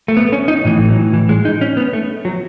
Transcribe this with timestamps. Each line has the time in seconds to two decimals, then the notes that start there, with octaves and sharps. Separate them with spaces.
0.08 A3
0.17 B3
0.32 C#4
0.48 D#4
0.65 A2 E3
0.89 F#3
1.14 E3
1.29 G#3
1.45 D#4
1.61 C#4
1.77 B3
1.93 A3
2.25 F#3